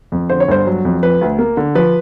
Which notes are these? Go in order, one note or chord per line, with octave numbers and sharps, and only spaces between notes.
F2
D3 C5
C#5
G1 C5
F#3
F2
F3 B4
D2
A#3
D3
F3 B4